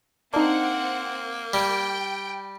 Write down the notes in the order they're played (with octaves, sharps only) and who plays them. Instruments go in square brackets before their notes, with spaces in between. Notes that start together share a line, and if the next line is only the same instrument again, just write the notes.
[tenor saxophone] A#3 [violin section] C4 F#5 [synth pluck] D4 D#4
[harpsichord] G3 [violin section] G5 D7